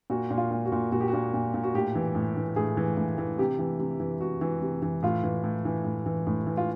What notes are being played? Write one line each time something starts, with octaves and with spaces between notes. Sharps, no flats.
A#2 F#4
A#2
F4
A#2
F#4
A#2
A#2 F#4
G4
F#4
A#2
A#2
A#2
F#4
A2 G4
E3
A2
E3
A2 G#4
E3
A2
E3
C3 G4
E3
C3
E3
C3 F#4
E3
C3
E3
A2 F4
E3
A2
E3
A2
E3
A2
E3
F4